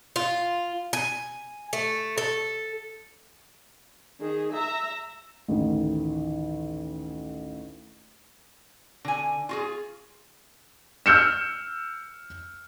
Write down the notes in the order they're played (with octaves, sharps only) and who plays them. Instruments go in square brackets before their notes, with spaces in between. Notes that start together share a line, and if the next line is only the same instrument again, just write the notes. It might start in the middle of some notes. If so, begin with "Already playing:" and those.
[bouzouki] F4
G#5
A3
A4
[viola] D#3 G#4
E5 A#5
[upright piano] A1 D2 D#3
[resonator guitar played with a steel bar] D3 G#5
F4 F#4 G#4
[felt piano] E6 F6 G6 C#7 E7